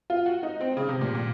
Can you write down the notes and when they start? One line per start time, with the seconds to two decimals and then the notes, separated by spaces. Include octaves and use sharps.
0.10 F4
0.26 F#4
0.43 D#4
0.60 C4
0.77 C#3
0.89 C3
1.01 A#2
1.15 A#2